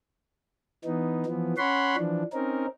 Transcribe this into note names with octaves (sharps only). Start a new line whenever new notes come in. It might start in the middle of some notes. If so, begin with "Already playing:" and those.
E3 B3 D#4
E3 F3 B3
C#4 C#5 F#5 B5 C6
E3 F3 D4
C4 C#4 D#4 A#4